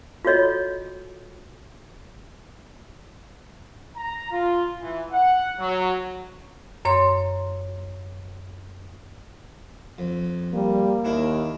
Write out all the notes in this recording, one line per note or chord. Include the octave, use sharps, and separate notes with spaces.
F4 F#4 A4 C#5 D#5
A#5
F4
E3
F#5
F#3
F#2 C#5 C6
F2
G3 A#3
D#2 D4 E4 A#4